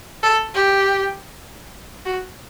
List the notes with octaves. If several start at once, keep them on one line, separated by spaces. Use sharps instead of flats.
A4
G4
F#4